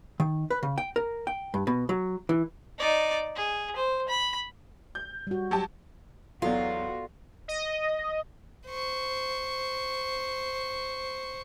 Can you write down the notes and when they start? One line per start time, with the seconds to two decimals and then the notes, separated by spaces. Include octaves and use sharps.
0.20 D#3
0.50 B4
0.63 C#3
0.78 G5
0.96 A#4
1.27 G5
1.54 G2
1.67 B2
1.89 F#3
2.29 E3
2.78 D#4 D5
3.36 G#4
3.76 C5
4.09 B5
4.95 G6
5.27 G3 F#4
5.51 F#3 G4 A5
6.42 E2 F#3 B3 F4 F#4 A4 D5
7.48 D#5
8.67 C5 C#6